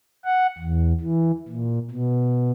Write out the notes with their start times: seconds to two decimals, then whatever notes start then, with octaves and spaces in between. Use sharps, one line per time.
0.25 F#5
0.58 E2
1.01 E3
1.48 A#2
1.91 B2